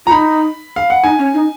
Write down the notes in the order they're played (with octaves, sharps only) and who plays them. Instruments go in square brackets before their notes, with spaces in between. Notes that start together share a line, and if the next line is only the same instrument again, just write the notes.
[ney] F4 [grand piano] A#5
[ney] D#4 [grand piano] B5
[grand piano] F5
F#5
[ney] D#4 [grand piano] G#5
[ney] C#4
D#4